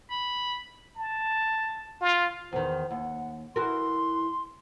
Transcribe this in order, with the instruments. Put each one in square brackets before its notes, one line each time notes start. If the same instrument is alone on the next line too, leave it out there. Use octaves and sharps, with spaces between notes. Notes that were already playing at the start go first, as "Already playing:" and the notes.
[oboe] B5
[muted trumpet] A5
F4
[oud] E2 D#3 [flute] C5
[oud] D#2 [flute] F#5
[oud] E3 F#4 A#4 [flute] C6